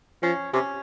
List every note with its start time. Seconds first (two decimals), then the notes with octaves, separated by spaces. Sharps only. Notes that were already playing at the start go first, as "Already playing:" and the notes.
0.23 F3 C#4
0.53 C3 C#4